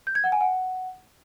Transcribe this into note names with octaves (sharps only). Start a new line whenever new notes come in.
G6
G#6
F#5
G#5
F#5